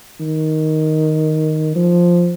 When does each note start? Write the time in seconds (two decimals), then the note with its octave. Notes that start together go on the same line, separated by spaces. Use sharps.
0.20 D#3
1.75 F3